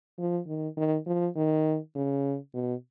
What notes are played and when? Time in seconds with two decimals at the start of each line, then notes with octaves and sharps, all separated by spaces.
0.19 F3
0.47 D#3
0.77 D#3
1.07 F3
1.36 D#3
1.95 C#3
2.54 B2